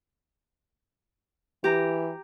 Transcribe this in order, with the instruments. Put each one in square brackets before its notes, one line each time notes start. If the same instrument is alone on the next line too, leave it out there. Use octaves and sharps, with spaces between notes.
[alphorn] E3 [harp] G4 A#5